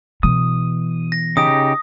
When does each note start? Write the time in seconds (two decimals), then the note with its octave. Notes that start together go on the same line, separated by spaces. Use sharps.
0.23 B2 E3 D#6
1.12 A#6
1.37 C#3 D#4 G4 D#6